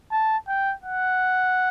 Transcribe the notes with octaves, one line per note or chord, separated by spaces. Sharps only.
A5
G5
F#5